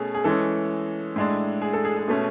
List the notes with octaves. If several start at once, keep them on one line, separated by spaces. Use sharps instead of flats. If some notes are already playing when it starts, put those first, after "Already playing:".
Already playing: B2 A3 C#4 G#4 A4
G#4
E3 G#3 C#4 A4
A2 G#3 D4
G#4
A4
G#4
G#4
B2 A3 C#4